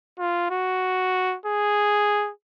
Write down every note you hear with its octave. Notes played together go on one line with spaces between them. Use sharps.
F4
F#4
G#4